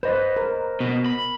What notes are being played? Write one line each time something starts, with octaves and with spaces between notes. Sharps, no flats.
B4 C5 D#5
A#4
B2
B5